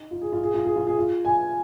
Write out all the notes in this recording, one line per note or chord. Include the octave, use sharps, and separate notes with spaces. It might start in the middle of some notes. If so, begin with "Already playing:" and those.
Already playing: D#4
F4
G#4
F4
G#4
F4
G#4
F4
G#4
F4
G#5